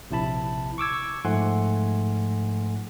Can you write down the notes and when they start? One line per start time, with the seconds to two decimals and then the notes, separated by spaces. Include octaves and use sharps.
0.11 A#1 C3 E4 A5 B5
0.78 C#6 D6 E6 G#6
1.25 G#2 F3 A3 F#5 G#5 C6